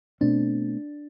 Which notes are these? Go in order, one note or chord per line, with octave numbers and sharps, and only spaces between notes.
B2 A3 C4 D4